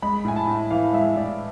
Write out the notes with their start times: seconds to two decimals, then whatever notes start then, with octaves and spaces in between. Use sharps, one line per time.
0.02 G#3 B5
0.25 A2 G#5
0.36 A5
0.47 A2
0.71 E3 F5
0.93 G#3 E5
1.16 A2 D5